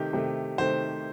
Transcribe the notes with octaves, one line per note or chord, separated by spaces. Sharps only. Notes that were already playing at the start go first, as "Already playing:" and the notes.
Already playing: C3 D#3 A3 G4
C3 D#3 A3
C3 D#3 A3 C5